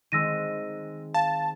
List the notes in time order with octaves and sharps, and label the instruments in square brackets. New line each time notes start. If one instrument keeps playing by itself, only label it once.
[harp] D#3 G#3 C4 [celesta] E6 A#6 D#7
[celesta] F5 [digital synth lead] A5